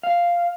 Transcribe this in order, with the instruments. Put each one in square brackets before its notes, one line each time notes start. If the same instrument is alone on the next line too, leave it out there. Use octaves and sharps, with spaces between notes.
[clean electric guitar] F5